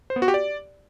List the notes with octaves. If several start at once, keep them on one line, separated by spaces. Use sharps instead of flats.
C5
B3
F#4
G4
D5